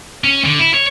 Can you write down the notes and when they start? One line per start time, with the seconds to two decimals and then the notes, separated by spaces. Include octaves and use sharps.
0.24 C#4
0.45 D3
0.59 E4
0.74 C#5